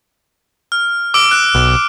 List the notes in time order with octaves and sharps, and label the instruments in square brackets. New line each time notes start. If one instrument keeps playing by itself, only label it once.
[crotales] F6
D6 E6 D7
F#6
[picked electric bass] B1